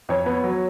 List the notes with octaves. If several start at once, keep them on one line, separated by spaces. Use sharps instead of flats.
F2 C#5
B3
F#3